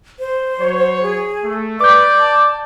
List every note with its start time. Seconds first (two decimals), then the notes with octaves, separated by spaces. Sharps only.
0.19 C5
0.60 F#3 C#5
1.03 G#4
1.44 A3
1.80 B4 D5 D6 G6
2.20 A5